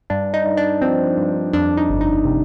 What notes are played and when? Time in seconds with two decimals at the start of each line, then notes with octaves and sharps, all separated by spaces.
0.10 G2 D4
0.34 D#4
0.46 G2
0.57 D4
0.82 F3 C4
1.18 G2
1.53 F2 D4
1.77 D#4
1.89 G1
2.01 D#4
2.25 C3